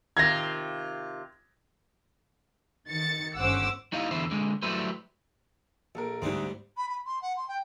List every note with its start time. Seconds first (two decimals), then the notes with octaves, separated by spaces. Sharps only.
0.17 C3 D#3 F4 G#6 A#6
2.89 D#3 A6 C#7
3.36 G1 C#4 C5 F#5 D6 E6
3.92 G3 D#4 E4 D#5 F5
4.11 E2 D3 E4 C5
4.31 D3 G#3
4.62 F#3 G3 A3 E4 B4 C5
5.95 A#1 A4 A#4
6.22 D2 G#2 G3 B3 C4
6.76 B5
6.89 B5
7.05 C6
7.21 F#5
7.36 C6
7.48 G5